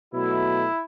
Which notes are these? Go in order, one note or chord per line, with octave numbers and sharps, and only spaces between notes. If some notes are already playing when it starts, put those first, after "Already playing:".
B2 F#3 A3 E4